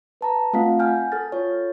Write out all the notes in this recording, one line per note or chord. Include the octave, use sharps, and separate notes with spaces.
B4 A5 A#5
A3 C4 F4 F5 F#5 B6
F#5 G#5 F6 G6
A4 F6 A6
F4 C#5